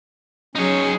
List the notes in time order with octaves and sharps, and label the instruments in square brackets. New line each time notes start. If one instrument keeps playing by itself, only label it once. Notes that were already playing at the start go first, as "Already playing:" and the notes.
[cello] F#3 G#4 [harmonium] C#4 [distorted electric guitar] D#4 C#5